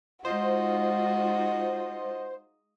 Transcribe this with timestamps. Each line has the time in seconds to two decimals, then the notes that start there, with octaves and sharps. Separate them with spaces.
0.25 G#3 D#4 F4 F#4 C5 D#5